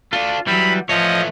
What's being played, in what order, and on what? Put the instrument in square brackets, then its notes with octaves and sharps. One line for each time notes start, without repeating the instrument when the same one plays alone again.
[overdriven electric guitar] A3 D4 [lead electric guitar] F4
[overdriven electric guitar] E3 [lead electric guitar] F#3 G3 [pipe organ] B5
[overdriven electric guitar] E3 A3 [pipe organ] F3 D#5 [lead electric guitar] C#5